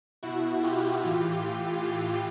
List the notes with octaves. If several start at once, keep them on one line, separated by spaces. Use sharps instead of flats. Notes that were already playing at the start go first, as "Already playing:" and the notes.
B2 E4 F#4
F4 G4
A2 E3
A2 E3